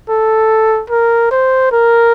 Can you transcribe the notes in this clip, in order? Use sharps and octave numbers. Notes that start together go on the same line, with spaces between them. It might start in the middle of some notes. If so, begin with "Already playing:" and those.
A4
A#4
C5
A#4